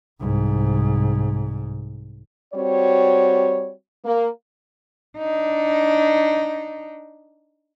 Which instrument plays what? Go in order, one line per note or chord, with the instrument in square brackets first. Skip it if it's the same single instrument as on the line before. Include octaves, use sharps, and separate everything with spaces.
[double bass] C2 G#2
[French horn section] G3 C4 F#4 C#5
A#3
[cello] D4 D#4